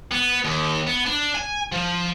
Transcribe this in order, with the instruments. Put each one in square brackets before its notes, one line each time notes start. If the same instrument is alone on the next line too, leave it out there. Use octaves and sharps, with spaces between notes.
[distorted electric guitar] B3
D#2
B3
D4
G#5
F3